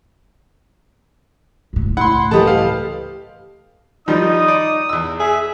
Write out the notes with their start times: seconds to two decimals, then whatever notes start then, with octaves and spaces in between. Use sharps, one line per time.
1.73 C#2 A2
1.97 E4 F#5 C6
2.31 E3 G4 A4 B4 D#5 A5
2.47 F5
4.08 D#3 F3 G3 D#4 D#6
4.48 D5
4.89 E2 E6
5.20 G#4 E5